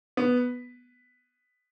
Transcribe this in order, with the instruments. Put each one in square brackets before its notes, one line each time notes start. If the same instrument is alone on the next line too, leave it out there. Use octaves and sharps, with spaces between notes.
[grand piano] B3